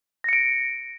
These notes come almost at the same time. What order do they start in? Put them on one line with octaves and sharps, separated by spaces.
A#6 C#7 D7